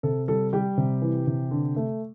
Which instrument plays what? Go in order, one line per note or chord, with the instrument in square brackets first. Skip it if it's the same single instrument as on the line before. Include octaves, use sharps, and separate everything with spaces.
[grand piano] C3 A4
G3 A4
G3 G4
C3
E3
C3
D3
A3